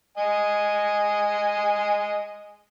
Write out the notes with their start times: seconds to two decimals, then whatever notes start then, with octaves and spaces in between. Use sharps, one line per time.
0.17 D#5 G#5